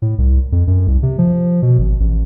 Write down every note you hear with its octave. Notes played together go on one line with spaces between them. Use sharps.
A2
C2
F2
F#2
C2
C3
F3
B2
G#1
A1